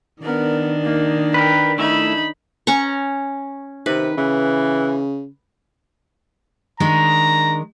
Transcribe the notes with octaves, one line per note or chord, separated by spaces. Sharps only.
D#3 B3 D4 A#4
A#3 D#4
A#4 B4 G5
A3 D#4 E4 E5 B5
C#4 A#5 C#6
C3 D#3 B4
C#3 E3
D#3 G#3 D4 A#5